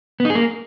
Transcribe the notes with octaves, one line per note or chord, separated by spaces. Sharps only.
B3
D#4
G#4
A#3